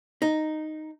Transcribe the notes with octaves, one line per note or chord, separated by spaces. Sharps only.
D#4